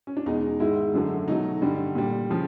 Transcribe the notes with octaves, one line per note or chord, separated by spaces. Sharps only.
C#4
D4
E2 B2 G#3 D#4
G#2 D#3 G#3 E4
F#2 D3 F#3 A3
B2 F#3 A3 D#4
G2 D3 G3
A#2 G3
C#3 F3